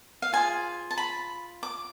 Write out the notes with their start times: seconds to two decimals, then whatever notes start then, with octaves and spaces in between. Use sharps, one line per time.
0.22 F5
0.33 F4 G#4 C5 G#5
0.91 A5
0.98 B5
1.63 D6